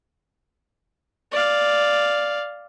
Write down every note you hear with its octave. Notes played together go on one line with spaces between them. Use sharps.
D5 F5